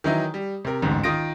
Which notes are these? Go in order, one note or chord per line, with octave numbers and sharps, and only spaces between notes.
D#3 E3 F#3 D#4 E4
G3
C3 A#4
A1 D2 G#2
D#3 F4 D#6 A#6 D7